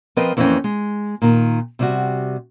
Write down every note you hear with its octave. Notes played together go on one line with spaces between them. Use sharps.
F3 C4 A#4 B4 D#5 G5
F2 E3 A#3 C4 C#4 G5
G#3
A#2 D#3
C3 G3 F#4